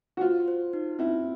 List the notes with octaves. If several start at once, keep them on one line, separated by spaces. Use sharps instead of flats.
F#4
F4 C5
C5
D#4
C4 E4